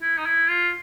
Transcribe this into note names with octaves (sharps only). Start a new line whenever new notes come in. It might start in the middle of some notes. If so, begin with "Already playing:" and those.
E4
D#4
E4
F4